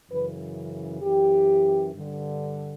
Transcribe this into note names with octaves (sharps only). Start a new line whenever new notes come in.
F#2 C#3 E3 B4
F#2 E3 G4
G2 D3